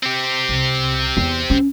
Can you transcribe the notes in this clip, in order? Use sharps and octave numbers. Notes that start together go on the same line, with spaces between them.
C4 G4
C2
E2
C#4